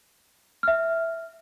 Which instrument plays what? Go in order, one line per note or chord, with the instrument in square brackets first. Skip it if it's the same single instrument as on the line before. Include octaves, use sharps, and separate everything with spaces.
[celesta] E5 F6